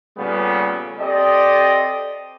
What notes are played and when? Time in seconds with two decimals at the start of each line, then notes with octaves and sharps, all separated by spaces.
0.17 A#2 C#3 G3 A3 B3
1.00 C4 G4 A4 D5 D#5